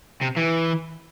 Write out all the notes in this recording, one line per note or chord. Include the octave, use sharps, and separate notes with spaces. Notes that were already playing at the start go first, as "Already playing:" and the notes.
C3
E3